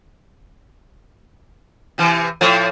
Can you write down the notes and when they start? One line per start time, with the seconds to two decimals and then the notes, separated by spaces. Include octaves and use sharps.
1.98 C3 E3
2.41 A2 F3